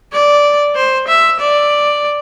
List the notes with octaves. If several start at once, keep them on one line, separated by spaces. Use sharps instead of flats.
D5
C5
E5
D5